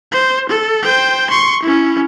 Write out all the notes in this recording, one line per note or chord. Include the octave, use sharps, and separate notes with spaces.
C5
A4
C5 G5
C6 C#6
C#4 E4